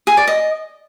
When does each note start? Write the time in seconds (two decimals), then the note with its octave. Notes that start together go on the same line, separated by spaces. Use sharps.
0.07 G#4
0.17 D5
0.27 D#5